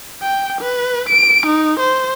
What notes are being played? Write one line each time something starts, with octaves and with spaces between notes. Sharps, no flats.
G5
B4
D7
D#4
C5